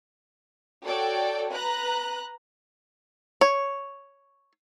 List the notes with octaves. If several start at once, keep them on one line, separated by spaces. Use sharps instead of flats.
F#4 A4 C#5 D5 G5
B4 A#5 F#6
C#5